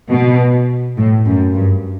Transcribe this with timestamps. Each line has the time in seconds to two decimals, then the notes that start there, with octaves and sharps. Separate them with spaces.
0.11 B2
0.97 A2
1.25 F#2
1.54 G2